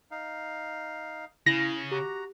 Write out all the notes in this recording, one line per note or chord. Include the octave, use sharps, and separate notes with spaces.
D#4 F5
C#3 E4 A#6
F#4 G4 A#5